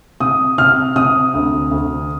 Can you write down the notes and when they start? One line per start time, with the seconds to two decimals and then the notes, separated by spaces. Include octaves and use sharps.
0.20 C3 D#6
0.58 C3 F6
0.96 C3 D#6
1.34 D2
1.71 D2